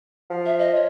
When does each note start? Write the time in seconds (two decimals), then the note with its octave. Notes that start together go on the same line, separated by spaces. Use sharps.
0.30 F3
0.46 E5
0.59 D#5
0.75 C#5